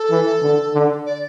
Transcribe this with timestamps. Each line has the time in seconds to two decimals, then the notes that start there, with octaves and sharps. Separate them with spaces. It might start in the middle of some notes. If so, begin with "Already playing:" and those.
Already playing: A4
0.11 E3
0.42 D3
0.74 D3
1.06 D5